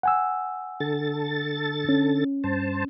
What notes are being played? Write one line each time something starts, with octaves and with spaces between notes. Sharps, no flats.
F#5 G#5 E6
D3 A4 A6
C#4
G2 C5 A5